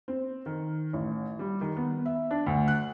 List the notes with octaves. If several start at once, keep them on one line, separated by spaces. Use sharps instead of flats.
C4
D#3
A1
G3
D#3
B3
E5
D4
D2
F#6